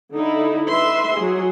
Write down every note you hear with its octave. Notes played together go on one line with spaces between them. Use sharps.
D3 D#4 E4
B4 E5 C6
F#3 G#4